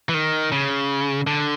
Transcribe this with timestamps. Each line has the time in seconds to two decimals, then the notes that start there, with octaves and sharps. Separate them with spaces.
0.09 E3
0.14 D#3
0.52 C#3
1.27 D3